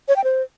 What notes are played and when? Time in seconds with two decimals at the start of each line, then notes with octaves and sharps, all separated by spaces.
0.08 C#5
0.16 G5
0.24 C5